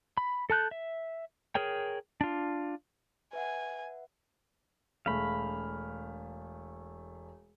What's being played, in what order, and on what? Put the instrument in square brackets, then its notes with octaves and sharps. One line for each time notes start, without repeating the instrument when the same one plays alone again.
[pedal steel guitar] B5
A4 A5 F#6 G6
E5
G#4 A#4 C#5 G5
D4 F4
[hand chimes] B4 E5 F#5 [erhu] G#5
[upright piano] E1 A3 [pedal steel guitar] F5 B5